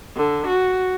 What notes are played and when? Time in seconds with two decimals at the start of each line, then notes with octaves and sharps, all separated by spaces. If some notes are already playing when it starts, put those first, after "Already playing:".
0.16 D3
0.47 F#4